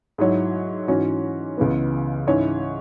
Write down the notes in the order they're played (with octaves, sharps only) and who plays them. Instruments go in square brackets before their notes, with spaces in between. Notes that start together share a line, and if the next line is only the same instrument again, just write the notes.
[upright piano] G#2 F#3 E4 C#5
G#2 E3 C#4 F#4 C#5
C#2 C#3 E3 B3
G#2 E3 C#4 E4 C#5